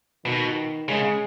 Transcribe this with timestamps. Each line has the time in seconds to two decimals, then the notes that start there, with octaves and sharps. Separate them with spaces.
0.25 B2 D#3
0.88 C#3 G#3